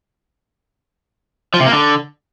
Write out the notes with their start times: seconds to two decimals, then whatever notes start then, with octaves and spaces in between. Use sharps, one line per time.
1.54 F3
1.60 C3
1.66 A#3
1.73 D3